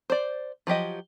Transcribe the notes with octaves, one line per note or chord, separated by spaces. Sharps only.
C5 D5
F3 F#3 G4 D#5